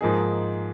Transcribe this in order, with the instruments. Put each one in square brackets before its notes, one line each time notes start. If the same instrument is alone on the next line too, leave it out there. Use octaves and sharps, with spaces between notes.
[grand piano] G#2 F3 A#3 D#4 G#4